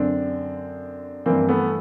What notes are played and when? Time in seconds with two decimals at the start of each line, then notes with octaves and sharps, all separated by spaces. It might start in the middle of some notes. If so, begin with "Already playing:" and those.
Already playing: F#2 D3 C4 D4
1.26 G2 E3 A#3 C4
1.49 A3 B3